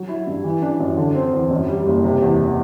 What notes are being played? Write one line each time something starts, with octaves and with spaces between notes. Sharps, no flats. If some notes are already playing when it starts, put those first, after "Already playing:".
Already playing: F#3
E4
G2
E3
D4
F#2
D3
C4
E2
F#2
G3
F#1
C3
E2